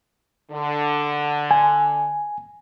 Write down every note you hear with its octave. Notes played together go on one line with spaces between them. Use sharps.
D3
G#5